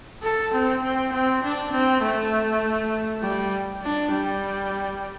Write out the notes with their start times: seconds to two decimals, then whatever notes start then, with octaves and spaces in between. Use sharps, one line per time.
0.23 A4
0.53 C4
0.83 C4
1.12 C4
1.43 D4
1.72 C4
2.02 A3
3.22 G3
3.82 D4
4.11 G3